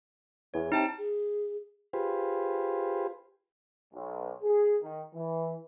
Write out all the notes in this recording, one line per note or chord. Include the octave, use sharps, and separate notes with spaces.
E2 C#5
C3 D#4 G5 A5
G#4
F4 G4 G#4 B4 C5
B1
G#4
D#3
E3